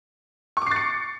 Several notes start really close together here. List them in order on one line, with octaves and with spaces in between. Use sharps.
C#6 D6 C7 A6 C#7